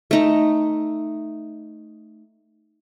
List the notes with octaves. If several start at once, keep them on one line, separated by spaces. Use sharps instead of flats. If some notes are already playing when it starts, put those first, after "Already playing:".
A3 D#4